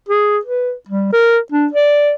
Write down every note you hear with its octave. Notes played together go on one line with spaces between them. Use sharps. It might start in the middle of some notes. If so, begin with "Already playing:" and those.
G#4
B4
G3
A#4
D4
D5